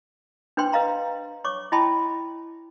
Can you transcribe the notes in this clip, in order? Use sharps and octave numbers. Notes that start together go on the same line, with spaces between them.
D4 B4 C5 G5 C6
B4 D#5 F5 A#5 C6
C#5 C#6 D6
E4 D#5 G5 A5 B5 C6